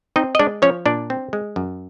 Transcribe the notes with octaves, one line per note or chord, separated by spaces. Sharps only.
C4 D#4 D#5
D#5
G#3 D4 D5
F3 C#4 C#5
A#2 D4 D5
C4
G#3
F#2